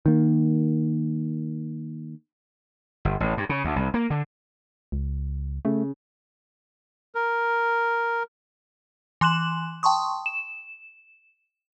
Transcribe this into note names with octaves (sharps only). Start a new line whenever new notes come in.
D#3 A#3
G1
A1
G2
C#3
D2
C2
A#3
D3
C#2
C#3 A3
A#4
E3 C6 F#6 E7 F#7
G5 A5 C6 C#6 D#6
E7